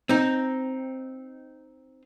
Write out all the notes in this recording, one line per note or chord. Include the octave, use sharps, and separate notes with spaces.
C4 D#4